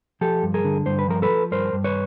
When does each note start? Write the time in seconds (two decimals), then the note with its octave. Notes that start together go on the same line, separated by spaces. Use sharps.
0.21 F3 G4 A4
0.43 G2
0.54 G#4 A#4
0.64 D3
0.86 G2 C5
0.99 B4
1.08 F3 A#4
1.22 A4 B4
1.30 F3
1.51 G2 A#4 C5
1.73 G2
1.84 B4 C#5